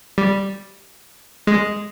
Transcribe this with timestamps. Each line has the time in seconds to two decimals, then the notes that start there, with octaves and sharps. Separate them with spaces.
0.18 G3
1.47 G#3